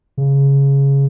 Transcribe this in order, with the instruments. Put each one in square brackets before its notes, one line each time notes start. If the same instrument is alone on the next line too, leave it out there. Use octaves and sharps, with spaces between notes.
[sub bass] C#3